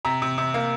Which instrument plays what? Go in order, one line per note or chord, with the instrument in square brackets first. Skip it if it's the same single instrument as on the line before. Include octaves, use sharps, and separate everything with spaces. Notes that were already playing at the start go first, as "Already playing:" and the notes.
[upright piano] C3 A#5
C3
C3
A#3